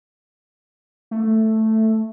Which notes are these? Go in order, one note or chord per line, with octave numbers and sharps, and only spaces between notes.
A3